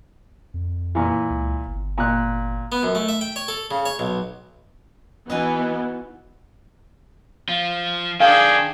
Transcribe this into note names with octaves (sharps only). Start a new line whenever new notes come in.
F2
A#2 E3
C#2
G1
A#2 F#6
B3
F#2
A3
E5
G5
C#5
A4
C#3
C#5
B1
E3 B3 D#4 F#4 G#5
F3 F4
D#3 D4 G#4 A4 F5 G5